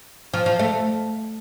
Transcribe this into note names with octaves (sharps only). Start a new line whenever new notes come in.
F3
F3
A3